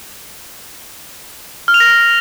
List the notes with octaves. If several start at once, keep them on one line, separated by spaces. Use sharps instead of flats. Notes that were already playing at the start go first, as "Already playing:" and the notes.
F6
F7
A#6